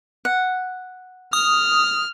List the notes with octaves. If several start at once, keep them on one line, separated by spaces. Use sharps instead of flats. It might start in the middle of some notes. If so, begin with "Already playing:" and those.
F#5
D#6 F6